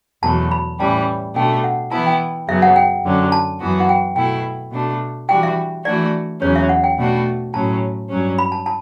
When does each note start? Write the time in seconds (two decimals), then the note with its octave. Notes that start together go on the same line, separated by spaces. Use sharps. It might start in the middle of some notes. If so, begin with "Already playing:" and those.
0.23 E2 B2 F#3 A3 A5
0.51 B5
0.80 A2 E3 G3 C#4 A5
1.36 B2 A3 D4 G5
1.64 F#5
1.91 E3 B3 E4 A5
2.07 G5
2.48 F#2 C#3 F#3 B3 E5
2.62 F#5
2.76 G5
3.04 F#2 D3 F#3 C#4
3.32 A5
3.60 F#2 E3 B3 F#4
3.80 F#5
3.89 G5
4.16 B2 A3 E4 G5
4.72 B2 A3 D4
5.29 E3 G3 D4 F#4 G5
5.43 E5
5.85 E3 A3 D4 F#4 D5
6.41 E2 C#3 F#3 C#4 C#5
6.56 E5
6.69 F#5
6.84 G5
6.98 B2 A3 D4 F#4
7.54 A2 F#3 C#4 A5
8.10 G2 F#3 C#4
8.38 B5
8.52 A5
8.66 A5